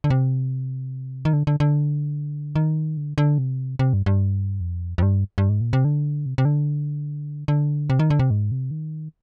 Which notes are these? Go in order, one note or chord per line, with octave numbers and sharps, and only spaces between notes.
D3
C3
D#3
D3
D3
D3
D#3
D3
D3
C3
C3
G2
G2
F2
F2
G2
G2
G#2
A#2
C3
D3
C3
C3
D3
D3
C3
D#3
D3
C3
G#2
C3
D#3